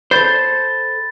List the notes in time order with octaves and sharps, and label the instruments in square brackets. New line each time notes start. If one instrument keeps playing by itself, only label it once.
[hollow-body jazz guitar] A4 C5 [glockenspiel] B5 A6